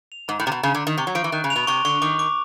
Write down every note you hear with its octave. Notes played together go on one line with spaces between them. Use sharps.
F7
G#2 A#5
A2
C3 A#5
B2
C#3 A#5
D3
A#5
D#3
C3 C#6
F#3
F3 D7
E3
D#3 F#6
C#3
F7
B2
C3 C#6
D3 C#6
D#3 D6
D6